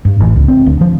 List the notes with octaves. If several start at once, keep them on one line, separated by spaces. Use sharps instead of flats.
G2
A1
C#2
C4
D2
F3